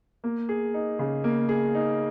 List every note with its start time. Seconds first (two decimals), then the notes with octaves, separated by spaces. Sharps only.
0.24 A#3
0.49 G#4
0.74 D#4
0.99 C#3
1.24 A#3
1.49 G#4
1.75 D#4